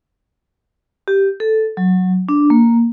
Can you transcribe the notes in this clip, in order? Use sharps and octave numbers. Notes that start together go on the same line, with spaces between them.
G4
A4
F#3
D4
A#3